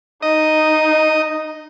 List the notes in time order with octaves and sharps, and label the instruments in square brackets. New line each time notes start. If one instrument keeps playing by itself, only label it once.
[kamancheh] D#4 [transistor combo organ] D#5